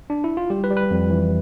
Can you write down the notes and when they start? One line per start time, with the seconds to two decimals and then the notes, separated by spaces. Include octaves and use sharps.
0.10 D4
0.24 E4
0.37 F4
0.50 G3 G4
0.64 B4
0.70 G3
0.77 B4
0.91 F2
1.10 E3